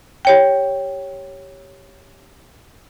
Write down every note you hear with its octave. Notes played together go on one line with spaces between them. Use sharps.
G4 C#5 G5